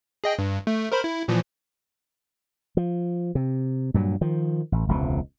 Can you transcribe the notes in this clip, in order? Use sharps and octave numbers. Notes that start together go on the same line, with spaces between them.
G#4 D#5 G5
G2
A3
A#4 C5 B5
E4
A#2 E3 F3
F3
C3
G2 A#2 F#3
D#3 F3
A1
E1 C#2 C3